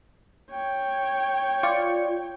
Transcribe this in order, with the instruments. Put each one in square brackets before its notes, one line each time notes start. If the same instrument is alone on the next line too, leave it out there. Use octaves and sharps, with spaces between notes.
[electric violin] C#5 G5
[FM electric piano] F4 D5 C#6